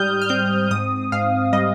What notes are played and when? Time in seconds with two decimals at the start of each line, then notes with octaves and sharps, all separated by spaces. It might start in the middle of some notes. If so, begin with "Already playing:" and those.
Already playing: G#2 G3 D#6 F6 G6
0.22 F6
0.29 C4 G6
0.71 G#2 D#6
1.12 G#2 F5
1.53 G3 D#5